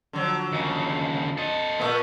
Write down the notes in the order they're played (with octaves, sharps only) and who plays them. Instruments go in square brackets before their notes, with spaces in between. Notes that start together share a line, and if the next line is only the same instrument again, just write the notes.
[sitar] D3 F3 F#3
[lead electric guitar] D#2 C#3
A4 D#5
[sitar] A#2 A3 B3